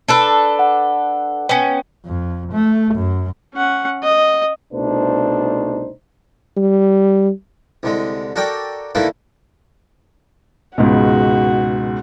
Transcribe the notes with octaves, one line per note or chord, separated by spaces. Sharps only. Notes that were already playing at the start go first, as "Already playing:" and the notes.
D4 A4 B4
F#5
B3 C#4 G5
F2
A3
F#2
C#4 F#5
D#5
C2 B2 A3 D4 D#4 C5
G3
C2 D3 G#3
F#4 A4 A#4 D5 G5
D3 D#3 A#3 E4 A4 B4
C#2 G#2 B2 F#4